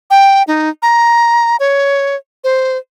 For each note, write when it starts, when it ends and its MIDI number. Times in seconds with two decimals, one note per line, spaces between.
0.10 0.43 79
0.47 0.69 63
0.82 1.56 82
1.60 2.16 73
2.44 2.77 72